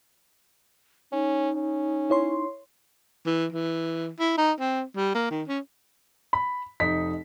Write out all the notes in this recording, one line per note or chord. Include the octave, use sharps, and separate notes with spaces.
C#4 D#4
C#4
E4 C#5 C6
E3
E3
E4
D#4
C4
G3
A#3
D#3
C#4
B5
F1 D#4 B6